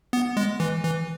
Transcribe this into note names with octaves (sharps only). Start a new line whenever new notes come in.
B3
G#3
E3
E3